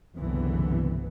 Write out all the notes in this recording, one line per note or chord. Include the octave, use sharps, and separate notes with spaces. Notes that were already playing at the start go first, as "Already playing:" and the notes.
F#1 C2 G2 D3 E3 B3